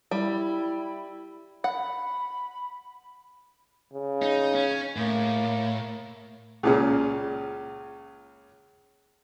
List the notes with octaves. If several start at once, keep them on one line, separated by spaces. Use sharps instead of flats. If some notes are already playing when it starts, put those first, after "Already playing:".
G3 E4
F#5 B5
C#3
D#4
C#4
A2 A#3
C#2 A#2 C#3